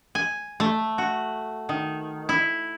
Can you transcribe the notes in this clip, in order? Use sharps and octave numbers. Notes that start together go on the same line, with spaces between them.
G#5
A3
F#4
D#3
E4